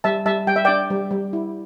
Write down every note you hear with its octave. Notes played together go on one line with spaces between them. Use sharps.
G3 E5 A5
G3 E5 A5
G3 G5
E5
D4 D5 G5
G3
G3
E4